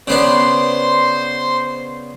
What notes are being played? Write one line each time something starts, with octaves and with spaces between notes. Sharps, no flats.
C#3 B3 D4 C5 C6